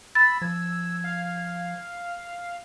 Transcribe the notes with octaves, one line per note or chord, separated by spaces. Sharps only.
B5 E6 A6
F3 G#6
F5